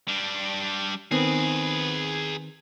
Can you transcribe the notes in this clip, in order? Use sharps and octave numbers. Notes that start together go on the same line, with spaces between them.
G3 D4
D#3 B3 C4 G#4 B4